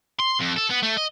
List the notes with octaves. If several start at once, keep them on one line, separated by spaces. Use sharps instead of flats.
C6
F2
A4
B3
A3
D#5